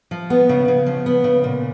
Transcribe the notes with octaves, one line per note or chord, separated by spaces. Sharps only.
F3
B3
C#3
C#3
F3
B3
C#3
A#2